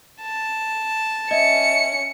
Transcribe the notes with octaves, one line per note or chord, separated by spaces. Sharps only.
A5
C#4 D#5 E5 C#7